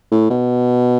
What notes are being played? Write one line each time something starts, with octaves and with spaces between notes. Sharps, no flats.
A2
B2